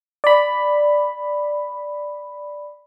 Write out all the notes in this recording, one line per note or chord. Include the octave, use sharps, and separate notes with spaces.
D5 B5